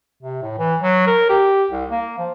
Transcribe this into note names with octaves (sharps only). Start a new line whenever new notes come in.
C3
A2
E3
F#3
A#4
G4
C2
A#3
F3